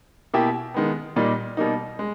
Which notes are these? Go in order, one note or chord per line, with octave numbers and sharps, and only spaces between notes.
B2 A#3 E4 G4
D#3 G#3 B3
A#2 G3 A#3 D#4
B2 G3 A#3 D#4
G#3